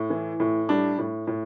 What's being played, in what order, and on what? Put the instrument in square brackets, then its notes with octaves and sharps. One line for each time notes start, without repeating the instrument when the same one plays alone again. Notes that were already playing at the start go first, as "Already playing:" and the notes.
Already playing: [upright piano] A2
E3
A2
G3 D4
A2
A2